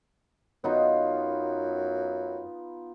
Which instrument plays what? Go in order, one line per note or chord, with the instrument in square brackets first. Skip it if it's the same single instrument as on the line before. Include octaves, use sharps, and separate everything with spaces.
[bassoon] F#2 [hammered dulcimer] B3 D#4 F4